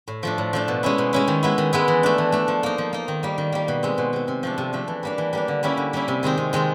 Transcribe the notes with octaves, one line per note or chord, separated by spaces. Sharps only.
A2
F3 A3 D4
A2
F3 A3 D4
B2
G#3 C#4 E4
B2
G#3 C#4 E4
D#3
G#3 B3 E4
D#3
G#3 B3 E4
E3
A3 D4
E3
A3 D4
F3
A#3 D#4
F3
A#3 D#4
D#3
G3 A#3
D#3
G3 A#3
B2
G#3 C4
B2
G#3 C4
C3
F3 A3 D4
C3
F3 A3 D4
E3
G3 A#3 D4
E3
G3 A#3 D4
D3
G3 A#3 C#4 E4
D3
G3 A#3 C#4 E4
C3
D#3 G#3 C4 D#4
C3
D#3 G#3 C4 D#4